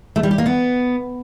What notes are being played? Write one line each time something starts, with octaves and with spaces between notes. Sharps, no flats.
A3
G3
G4
A#3
B3